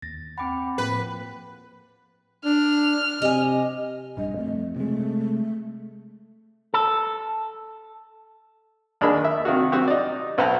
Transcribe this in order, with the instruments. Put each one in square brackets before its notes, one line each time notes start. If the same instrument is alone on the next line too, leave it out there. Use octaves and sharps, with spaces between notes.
[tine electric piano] D#2 A#6 [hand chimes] A6
[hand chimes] C4 G5 B5 [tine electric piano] F#5 D6
[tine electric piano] A2 F3 A#3 [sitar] B4
[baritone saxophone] D4 [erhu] F6
[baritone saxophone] C3 [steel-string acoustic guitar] D#5 G#5
[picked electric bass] A#1 G2 [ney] D#5
[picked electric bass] F2 [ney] A3
[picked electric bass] C3 G#3 [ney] A3
[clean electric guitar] A4
[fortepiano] D#2 D4 D#4 G#4 A#4 B5
E5
C3 D#3 F4 F#4
C4 F#4 G4
D#4 D5
B1 B4 C5 F#5 A5 A#5